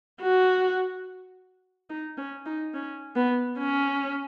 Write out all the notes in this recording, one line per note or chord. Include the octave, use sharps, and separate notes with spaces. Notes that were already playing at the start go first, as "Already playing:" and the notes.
F#4
D#4
C#4
D#4
C#4
B3
C#4